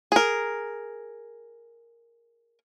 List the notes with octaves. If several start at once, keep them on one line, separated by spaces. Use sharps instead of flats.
G#4 A#4